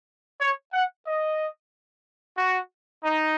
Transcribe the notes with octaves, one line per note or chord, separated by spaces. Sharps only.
C#5
F#5
D#5
F#4
D#4